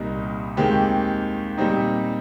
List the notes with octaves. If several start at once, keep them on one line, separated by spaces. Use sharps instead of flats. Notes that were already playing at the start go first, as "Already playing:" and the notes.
Already playing: C2 A#2 G3 A#3 D#4
D#2 D#3 G#3 C4 G4
A#2 G3 C4 D#4